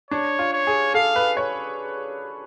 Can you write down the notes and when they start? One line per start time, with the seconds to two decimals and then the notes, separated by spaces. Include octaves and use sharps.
0.10 D4 C#5
0.39 F4
0.53 C#5
0.67 G#4
0.94 A4 F5
1.16 B4
1.37 C#5